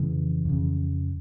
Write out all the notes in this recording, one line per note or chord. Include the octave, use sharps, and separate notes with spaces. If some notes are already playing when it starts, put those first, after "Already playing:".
Already playing: F2 C#3 E3
F2 C#3